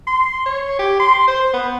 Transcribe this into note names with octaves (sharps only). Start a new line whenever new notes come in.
C6
C#5
G4
C6
C5
B3